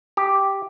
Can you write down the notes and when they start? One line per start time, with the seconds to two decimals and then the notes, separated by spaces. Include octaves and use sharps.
0.17 G4